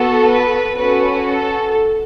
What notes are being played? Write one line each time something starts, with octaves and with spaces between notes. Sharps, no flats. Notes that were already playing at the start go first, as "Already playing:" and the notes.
Already playing: B3 F#4 A4
B4
C#4 F#4 A4 B4
A4